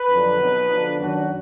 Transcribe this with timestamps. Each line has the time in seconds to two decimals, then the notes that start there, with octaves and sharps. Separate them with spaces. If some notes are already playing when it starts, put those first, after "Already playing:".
Already playing: B4
0.09 F2 D3 F#3 D4
0.39 B2 F#3 B3 D#4
0.69 D3 F3 B3 D4
0.98 F#2 D#3 F#3 D4 F#4